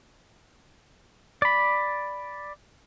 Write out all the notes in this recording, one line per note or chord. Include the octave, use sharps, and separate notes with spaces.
D5 B5